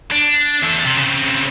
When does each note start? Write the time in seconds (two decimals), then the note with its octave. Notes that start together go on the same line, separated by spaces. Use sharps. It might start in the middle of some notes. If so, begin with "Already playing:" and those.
0.12 D4
0.63 E2 A4
0.85 C3
0.98 C#3 C4